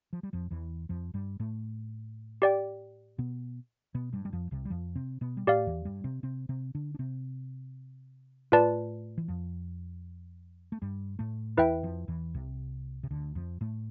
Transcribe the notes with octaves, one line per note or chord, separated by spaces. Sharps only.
F3
G3
F2 F3
E2 E3
F2 F3
G2 G3
A2 A3
G4 D5 G5
B2 B3
B2 B3
G2 G3
G3
F2 F3
C2 C3
G3
F2 F3
C3 C4
B2 B3
G3
A2 A3 G4 D5 F5
E2 E3
G2 G3
C3 C4
C3 C4
C3 C4
D3 D4
D4
C3 C4
A2 A3 F4 B4 D5 A5
E3
F2 F3
A3
G2 G3
A2 A3
E2 E3 E4 B4 E5 G5
F2 F3
E2 E3
C2 C3
C3
D2 D3
F2 F3
A2 A3